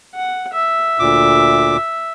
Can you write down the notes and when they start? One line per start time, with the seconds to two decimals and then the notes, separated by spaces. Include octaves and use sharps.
0.15 F#5
0.53 E5
0.99 D2 A#2 D6